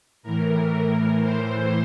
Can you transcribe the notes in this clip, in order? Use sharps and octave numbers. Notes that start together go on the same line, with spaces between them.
A2 E3 A#4
A2 E3 C5